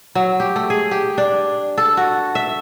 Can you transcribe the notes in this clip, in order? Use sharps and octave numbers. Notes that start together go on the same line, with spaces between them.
F#3
G4
A3
G#4
G4
D4
A4
F#4
E5